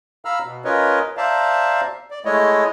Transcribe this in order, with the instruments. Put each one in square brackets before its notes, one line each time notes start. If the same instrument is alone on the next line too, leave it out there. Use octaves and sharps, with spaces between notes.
[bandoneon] F5 A#5 B5 E6 F6
B2
C#4 F4 A#4 B4 C#5 D#5
C5 D5 E5 F5 A5 A#5
D5
G#3 A3 E4 C#5 D#5